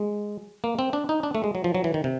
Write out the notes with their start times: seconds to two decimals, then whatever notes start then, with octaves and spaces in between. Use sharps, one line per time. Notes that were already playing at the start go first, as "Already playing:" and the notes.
Already playing: G#3
0.64 A#3
0.79 C4
0.93 D4
1.09 D#4
1.23 D4
1.35 A3
1.44 G#3
1.55 F#3
1.64 F3
1.75 F#3
1.84 E3
1.94 D#3
2.04 C3